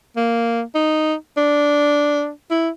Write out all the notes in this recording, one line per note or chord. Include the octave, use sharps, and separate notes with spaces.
A#3
D#4
D4
E4